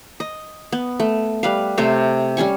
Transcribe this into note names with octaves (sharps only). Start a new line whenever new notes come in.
D#5
B3
A3
G3 B4 F5
C3 A3 C5 C#5
G3 C#4 G#5 C#6